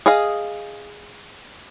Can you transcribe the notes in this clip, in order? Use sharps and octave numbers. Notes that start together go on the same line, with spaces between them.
G#4 D#5 F5